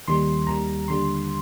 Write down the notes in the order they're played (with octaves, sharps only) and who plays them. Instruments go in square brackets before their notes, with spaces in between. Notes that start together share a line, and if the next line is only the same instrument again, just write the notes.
[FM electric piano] D#2 D#3 G3 C6
D#2 D#3 G3 A#5
D#2 D3 G3 C6